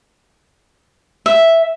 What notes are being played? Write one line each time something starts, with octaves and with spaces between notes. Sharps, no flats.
E5